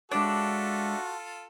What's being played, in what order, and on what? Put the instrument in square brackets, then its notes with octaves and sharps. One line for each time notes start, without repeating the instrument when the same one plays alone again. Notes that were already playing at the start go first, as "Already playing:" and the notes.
[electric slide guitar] G#3 C#5 [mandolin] D4 E5 [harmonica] F4 A4 [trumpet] F#4